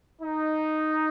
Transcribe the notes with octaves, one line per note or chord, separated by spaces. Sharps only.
D#4